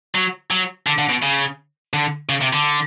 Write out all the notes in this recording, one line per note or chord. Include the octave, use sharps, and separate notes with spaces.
F#3
F#3
D3
D3
B2
C#3
D3
C#3
C3
D3